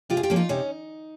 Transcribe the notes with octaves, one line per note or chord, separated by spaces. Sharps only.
C3 F4 G4
G#4
F4 G4
F3 A#3 C#4
D#4 F4
C3 C#4 D#4